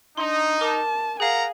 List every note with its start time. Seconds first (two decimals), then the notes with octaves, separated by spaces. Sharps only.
0.17 D4 D#4 C6
0.61 A#4 A5 D6
1.20 G#4 A#4 F5 F#5 G#5 A#5